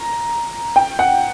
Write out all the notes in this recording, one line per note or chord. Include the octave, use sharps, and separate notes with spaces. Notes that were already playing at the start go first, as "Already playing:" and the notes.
Already playing: A#5
G5
F#5